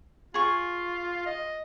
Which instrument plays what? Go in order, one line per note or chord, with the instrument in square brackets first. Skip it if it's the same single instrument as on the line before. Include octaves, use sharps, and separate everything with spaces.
[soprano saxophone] F4 [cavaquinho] G#4 C#6
[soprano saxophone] D#5